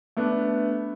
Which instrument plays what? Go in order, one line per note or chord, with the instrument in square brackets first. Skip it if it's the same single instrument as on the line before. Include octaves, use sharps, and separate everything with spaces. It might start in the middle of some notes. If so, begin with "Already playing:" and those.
[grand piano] A3 B3 D4